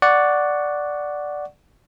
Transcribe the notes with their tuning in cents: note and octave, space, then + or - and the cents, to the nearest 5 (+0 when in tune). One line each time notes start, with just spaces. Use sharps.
D5 +0 F#5 +0 C#6 +5